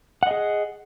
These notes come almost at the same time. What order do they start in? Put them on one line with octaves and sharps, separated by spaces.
F#5 D#5 G#4